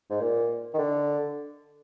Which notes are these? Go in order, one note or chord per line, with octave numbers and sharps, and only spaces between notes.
G#2
A#2
D#3
D3